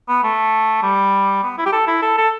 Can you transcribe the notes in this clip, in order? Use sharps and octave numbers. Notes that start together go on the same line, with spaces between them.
B3
A3
G3
B3
E4
G4
A4
E4
A4
A4